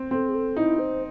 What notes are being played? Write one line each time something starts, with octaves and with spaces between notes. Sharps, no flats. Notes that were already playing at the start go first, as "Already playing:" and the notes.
Already playing: C4
C4 A4
G#4
A4
D#4 E4
C5